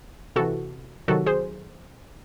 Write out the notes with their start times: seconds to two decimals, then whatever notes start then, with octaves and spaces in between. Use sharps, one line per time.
0.36 C3 E3 F#4 A4
1.08 C3 D#3 F#3 F#4 A4
1.26 G#4 C5